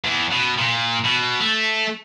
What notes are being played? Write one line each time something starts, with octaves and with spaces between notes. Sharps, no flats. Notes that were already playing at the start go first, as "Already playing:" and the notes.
E2
B2
A#2
B2
A3